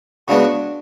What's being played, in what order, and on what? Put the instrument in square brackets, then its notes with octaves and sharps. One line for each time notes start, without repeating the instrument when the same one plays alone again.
[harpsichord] C#3 G#3 B3 [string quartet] D4 F#4